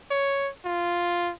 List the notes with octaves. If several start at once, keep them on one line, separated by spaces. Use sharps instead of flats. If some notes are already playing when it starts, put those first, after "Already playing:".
C#5
F4